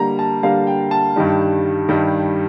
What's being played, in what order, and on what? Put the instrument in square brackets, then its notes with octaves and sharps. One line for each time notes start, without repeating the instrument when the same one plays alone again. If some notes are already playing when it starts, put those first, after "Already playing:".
Already playing: [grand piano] D3 G3 A#3 A#5
A5
D3 G3 A#3 F5
G5
A5
G2 D#3 G3
G2 D#3 G3